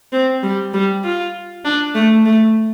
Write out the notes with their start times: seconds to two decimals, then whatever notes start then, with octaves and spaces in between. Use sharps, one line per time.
0.12 C4
0.43 G3
0.74 G3
1.04 F4
1.65 D4
1.95 A3
2.26 A3